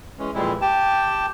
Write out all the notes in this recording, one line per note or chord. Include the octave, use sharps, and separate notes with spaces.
E3 G#3 C#4
F2 A#2 E3 G3 G#3 E4
G4 G5 A5